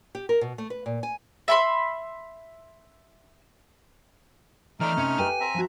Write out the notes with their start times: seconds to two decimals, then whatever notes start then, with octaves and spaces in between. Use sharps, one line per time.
0.15 G4
0.29 A#4
0.41 B2
0.58 A3
0.70 B4
0.86 A#2
1.03 G#5
1.48 E5 B5 C6
4.80 E3 A3 D#4 D5 F6
4.98 C3 C#4
5.19 G4 B4 G5 G#5
5.40 C4 E5 A#5
5.54 F3 F#4